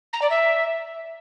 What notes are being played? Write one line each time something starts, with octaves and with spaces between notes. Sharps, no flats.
A#5
D5
E5